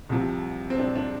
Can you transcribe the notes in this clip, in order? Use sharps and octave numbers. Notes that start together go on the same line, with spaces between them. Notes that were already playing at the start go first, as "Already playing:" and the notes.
C2 C3 F3
C4
D4
D4